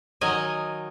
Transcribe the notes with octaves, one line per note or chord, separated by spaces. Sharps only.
D#3 F#3 D#5 G#5